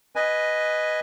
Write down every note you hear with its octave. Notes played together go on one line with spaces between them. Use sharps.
B4 D#5 G#5